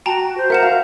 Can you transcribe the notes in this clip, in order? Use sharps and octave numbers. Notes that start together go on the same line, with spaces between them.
F#4 G5 A5 A#5
C5
A#4 E5 F#5 E7
F#4 F5